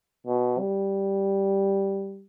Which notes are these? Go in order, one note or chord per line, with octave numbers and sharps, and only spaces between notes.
B2
G3